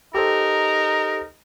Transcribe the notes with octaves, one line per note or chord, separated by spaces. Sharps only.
D#4 G4 A4 A#4 C5